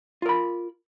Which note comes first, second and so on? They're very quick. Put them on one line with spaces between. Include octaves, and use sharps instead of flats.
F4 A#4 B5